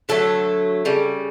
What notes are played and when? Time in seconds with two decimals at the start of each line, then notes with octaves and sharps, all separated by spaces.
0.09 D3 F#3 A3 A4
0.85 C#3 G3